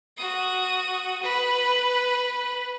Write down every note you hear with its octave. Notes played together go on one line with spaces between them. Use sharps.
F#4 D#6
B4